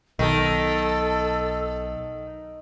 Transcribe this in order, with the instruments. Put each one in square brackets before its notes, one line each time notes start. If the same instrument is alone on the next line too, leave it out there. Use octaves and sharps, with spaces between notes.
[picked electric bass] B1 [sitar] D#3 [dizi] A4